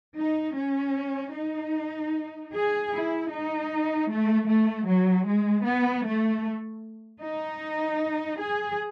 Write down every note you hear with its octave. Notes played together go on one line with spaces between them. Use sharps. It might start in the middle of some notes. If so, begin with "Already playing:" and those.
D#4
C#4
D#4
G#4
E4
D#4
A3
A3
F#3
G#3
B3
A3
D#4
G#4